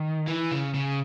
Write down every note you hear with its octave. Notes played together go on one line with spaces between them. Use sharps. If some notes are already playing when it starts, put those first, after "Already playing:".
Already playing: D#3
E3
C#3
C#3